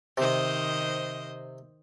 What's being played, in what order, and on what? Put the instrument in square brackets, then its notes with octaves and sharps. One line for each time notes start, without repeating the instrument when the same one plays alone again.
[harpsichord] C3 [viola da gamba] D#3 C5 D#5